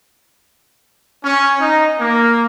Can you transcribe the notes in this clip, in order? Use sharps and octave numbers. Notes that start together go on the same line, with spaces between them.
C#4
D#4
A#3